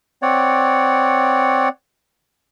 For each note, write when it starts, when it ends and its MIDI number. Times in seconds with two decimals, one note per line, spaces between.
0.22 1.69 60
0.22 1.69 73
0.22 1.69 74
0.22 1.69 78